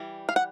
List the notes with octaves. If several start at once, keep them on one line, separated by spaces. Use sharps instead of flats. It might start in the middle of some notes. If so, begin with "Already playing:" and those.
Already playing: E3 G3
F5
F#5